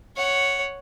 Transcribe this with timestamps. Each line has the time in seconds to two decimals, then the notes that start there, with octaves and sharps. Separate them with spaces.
0.17 C#5 F#5